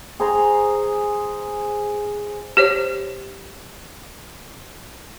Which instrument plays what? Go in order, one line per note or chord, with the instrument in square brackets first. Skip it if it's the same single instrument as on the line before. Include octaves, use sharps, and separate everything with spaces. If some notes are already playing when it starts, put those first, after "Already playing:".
[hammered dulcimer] G#4 C5 A#5
[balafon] G4 C5 C#5